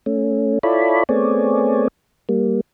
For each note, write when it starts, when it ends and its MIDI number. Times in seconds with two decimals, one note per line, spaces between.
0.06 0.59 57
0.06 0.59 61
0.63 1.03 64
0.63 1.03 65
0.63 1.03 69
0.63 1.03 73
0.63 1.03 74
0.63 1.03 83
1.09 1.88 57
1.09 1.88 59
1.09 1.88 60
1.09 1.88 68
1.09 1.88 73
1.09 1.88 74
2.29 2.61 55
2.29 2.61 58